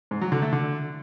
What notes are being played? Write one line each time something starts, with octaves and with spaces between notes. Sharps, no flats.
G#2
F#3
D3
A3
D3